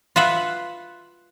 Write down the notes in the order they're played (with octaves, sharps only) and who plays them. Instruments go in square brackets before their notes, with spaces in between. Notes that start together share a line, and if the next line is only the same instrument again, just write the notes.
[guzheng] F4 B4 E5 F#5